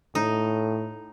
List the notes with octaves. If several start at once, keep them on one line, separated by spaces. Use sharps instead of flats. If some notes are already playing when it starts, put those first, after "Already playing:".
A2 D#4